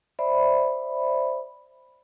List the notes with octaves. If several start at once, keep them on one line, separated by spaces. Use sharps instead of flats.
C5 D5 E5 B5